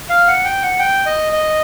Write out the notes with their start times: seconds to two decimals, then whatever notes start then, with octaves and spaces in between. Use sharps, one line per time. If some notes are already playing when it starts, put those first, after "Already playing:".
0.10 F5
0.28 F#5
0.45 G5
0.63 F#5
0.79 G5
1.06 D#5
1.33 D#5